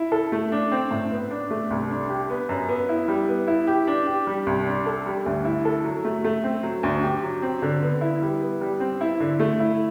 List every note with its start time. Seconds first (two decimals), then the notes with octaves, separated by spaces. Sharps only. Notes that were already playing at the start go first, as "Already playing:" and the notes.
Already playing: E4
0.12 A4
0.32 A3
0.52 D4
0.72 C4
0.91 A2
1.11 B3
1.31 D4
1.51 A3
1.70 C2
1.90 D4
2.10 G4
2.30 B3
2.49 F#2
2.69 B3
2.89 E4
3.08 G3
3.29 B3
3.47 E4
3.67 G4
3.87 D4
4.07 G4
4.27 G3
4.47 C2
4.67 D4
4.86 A4
5.06 G3
5.26 D2
5.45 E4
5.65 A4
5.84 F#3
6.05 A3
6.25 A3
6.44 C4
6.63 F#3
6.83 D2
7.03 G4
7.23 F#3
7.42 C4
7.62 D3
7.82 B3
8.01 E4
8.22 G3
8.41 B3
8.61 G3
8.80 C4
9.01 E4
9.20 D3
9.40 A3
9.60 E4